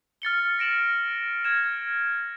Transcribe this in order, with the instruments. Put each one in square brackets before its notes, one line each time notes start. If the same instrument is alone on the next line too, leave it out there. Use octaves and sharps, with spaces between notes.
[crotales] F6 A6 C#7 G7
A#6 D7 E7 F#7
F6 G#6 E7